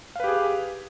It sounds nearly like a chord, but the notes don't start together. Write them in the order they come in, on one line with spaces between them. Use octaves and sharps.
F5 B4 G4 G#4